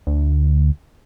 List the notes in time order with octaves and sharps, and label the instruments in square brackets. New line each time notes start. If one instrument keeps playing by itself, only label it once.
[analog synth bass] D2